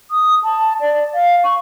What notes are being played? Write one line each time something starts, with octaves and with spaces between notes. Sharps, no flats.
D#6
A5
D5
F5
C#6